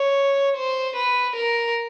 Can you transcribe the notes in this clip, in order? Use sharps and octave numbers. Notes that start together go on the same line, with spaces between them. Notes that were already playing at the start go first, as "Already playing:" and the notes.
Already playing: C#5
C5
B4
A#4